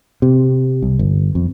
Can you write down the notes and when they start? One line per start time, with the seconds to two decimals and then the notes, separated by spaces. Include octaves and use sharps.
0.22 C3
0.82 C2
0.99 G1
1.35 F2